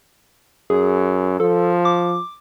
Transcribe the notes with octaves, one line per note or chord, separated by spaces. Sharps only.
F#2 G#4
F3 A4
D6